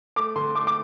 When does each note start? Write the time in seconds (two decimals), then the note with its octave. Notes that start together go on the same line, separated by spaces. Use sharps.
0.16 A3 D6
0.36 D3 C6
0.55 A3 D6
0.67 D6